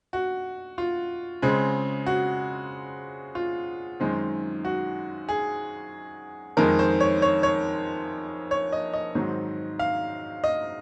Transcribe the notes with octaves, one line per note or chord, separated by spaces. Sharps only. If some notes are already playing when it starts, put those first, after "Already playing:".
F#4
F4
C#3 G#3 C4
F#4
F4
F#2 D#3 G#3 C4
F#4
G#4
F2 D#3 G#3 A#4
C5
C#5
C#5
C#5
C#5
D#5
D#5
G#2 D#3 F#3 C4
F5
D#5